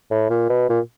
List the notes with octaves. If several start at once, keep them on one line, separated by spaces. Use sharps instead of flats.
A2
A#2
B2
A#2